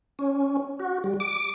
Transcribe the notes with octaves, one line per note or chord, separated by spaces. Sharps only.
C#4
F#4
G3
D6